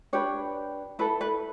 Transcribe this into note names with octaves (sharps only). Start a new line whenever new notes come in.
D4 G4 B4 C#5
E4 A4 B4
B4